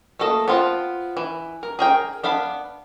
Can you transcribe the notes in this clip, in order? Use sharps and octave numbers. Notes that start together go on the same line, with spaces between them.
A3 A#3 A4 D#5
B3 C4 F4 B4 A5
E3
A#4
G#4 A#4 G5
B3 D4 F5 B5